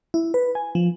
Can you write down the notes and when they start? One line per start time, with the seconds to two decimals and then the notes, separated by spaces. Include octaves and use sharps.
0.14 E4
0.34 B4
0.55 G#5
0.75 F3